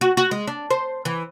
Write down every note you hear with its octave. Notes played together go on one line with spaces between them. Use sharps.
F#4
F#4
G#3
D4
C5
E3